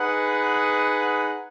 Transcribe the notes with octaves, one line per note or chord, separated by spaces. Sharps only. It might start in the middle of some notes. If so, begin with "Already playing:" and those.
Already playing: D#4 G#4 B4 F#5